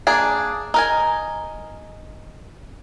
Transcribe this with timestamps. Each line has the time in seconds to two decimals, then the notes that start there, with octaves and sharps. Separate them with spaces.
0.07 A#3 D4 G#4
0.74 D#4 A#4 G#5